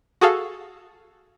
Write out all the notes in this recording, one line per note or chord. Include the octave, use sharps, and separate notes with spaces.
F#4 G#4 A4 F5